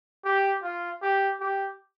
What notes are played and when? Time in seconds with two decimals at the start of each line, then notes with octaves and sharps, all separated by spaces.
0.25 G4
0.63 F4
1.02 G4
1.40 G4